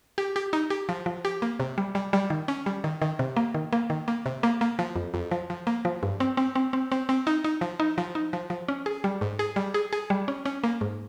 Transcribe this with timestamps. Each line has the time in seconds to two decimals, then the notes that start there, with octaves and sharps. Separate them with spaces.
0.18 G4
0.36 G4
0.53 D#4
0.70 G4
0.89 F3
1.06 F3
1.25 G4
1.42 A#3
1.60 C3
1.78 G3
1.95 G3
2.13 G3
2.30 D#3
2.48 C#4
2.66 G3
2.84 D#3
3.02 D#3
3.19 C3
3.37 A#3
3.55 D#3
3.73 A#3
3.90 D#3
4.08 A#3
4.26 C3
4.43 A#3
4.61 A#3
4.79 F3
4.96 F2
5.14 F2
5.31 F3
5.50 F3
5.67 A#3
5.85 F3
6.03 G2
6.20 C4
6.37 C4
6.55 C4
6.73 C4
6.92 C4
7.09 C4
7.27 D#4
7.44 D#4
7.61 F3
7.80 D#4
7.98 F3
8.15 D#4
8.33 F3
8.50 F3
8.68 C#4
8.86 G#4
9.04 G3
9.21 G#2
9.39 G#4
9.56 G3
9.74 G#4
9.93 G#4
10.10 G3
10.28 C#4
10.46 C#4
10.64 A#3
10.81 G#2